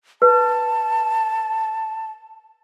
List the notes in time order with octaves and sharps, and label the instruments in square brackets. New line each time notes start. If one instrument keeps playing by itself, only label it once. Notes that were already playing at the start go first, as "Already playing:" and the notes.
[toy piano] B4 [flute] A5